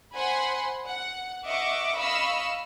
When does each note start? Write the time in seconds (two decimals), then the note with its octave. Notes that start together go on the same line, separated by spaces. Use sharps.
0.17 C5 F#5 G#5 B5 C6
0.88 F#5
1.47 D#5 E5 F#5 C#6 D6
2.00 D#5 F5 B5 C#6 E6